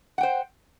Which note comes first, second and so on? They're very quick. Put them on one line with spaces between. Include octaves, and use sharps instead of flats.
F#5 G5 C5